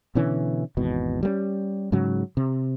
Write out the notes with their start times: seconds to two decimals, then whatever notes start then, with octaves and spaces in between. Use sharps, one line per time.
0.15 B2 D3 E3 C#4
0.77 G#1 E2 B2
1.23 G3 A3 C#4
1.92 G#2 C#3 F#3
2.37 C3